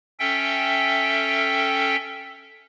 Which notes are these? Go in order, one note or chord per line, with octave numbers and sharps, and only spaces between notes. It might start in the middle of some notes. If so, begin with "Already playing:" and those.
C#4 A4 E5 G5